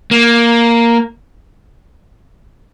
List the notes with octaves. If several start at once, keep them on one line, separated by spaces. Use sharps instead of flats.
A#3